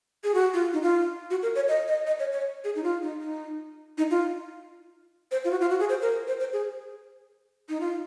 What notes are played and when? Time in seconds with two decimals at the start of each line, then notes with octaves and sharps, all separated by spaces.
0.24 G#4
0.34 F#4
0.54 F4
0.73 D#4
0.82 F4
1.31 F#4
1.43 A#4
1.56 C#5
1.68 D#5
1.87 D#5
2.07 D#5
2.19 C#5
2.32 C#5
2.64 G#4
2.76 D#4
2.84 F4
3.03 D#4
3.21 D#4
3.98 D#4
4.11 F4
5.31 C5
5.45 F4
5.51 F#4
5.61 F4
5.70 F#4
5.80 G#4
5.89 C5
6.02 A#4
6.27 C5
6.40 C5
6.53 G#4
7.69 D#4
7.80 F4